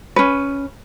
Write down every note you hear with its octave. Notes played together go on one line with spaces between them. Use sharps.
C#4 B4